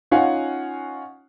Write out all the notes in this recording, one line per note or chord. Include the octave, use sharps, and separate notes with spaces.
C#4 D#4 F4 F5 F#5 G#5